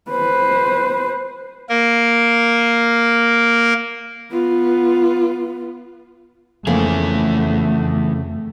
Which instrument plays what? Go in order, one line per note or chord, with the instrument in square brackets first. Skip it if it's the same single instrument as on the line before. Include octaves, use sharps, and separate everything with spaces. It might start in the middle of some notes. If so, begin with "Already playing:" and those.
[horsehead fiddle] B4 C5
[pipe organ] A#3 A#4
[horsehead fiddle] B3 F4
[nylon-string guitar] F2 A#3 [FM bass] C#3 [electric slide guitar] E3 G#4 [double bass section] A3